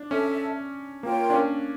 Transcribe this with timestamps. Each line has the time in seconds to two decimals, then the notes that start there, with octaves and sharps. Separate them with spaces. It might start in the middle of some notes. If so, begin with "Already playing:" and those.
Already playing: D4
0.11 C#4 A4 E5 A5
1.03 A#3 F4 A#4 C#5 G5
1.30 D4
1.34 C#4